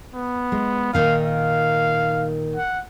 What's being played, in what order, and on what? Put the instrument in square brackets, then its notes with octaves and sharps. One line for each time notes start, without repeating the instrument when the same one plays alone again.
[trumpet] B3
[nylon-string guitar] G#3
[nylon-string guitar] A#2 D#3 D#4 [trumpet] F5
[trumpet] F5
F#5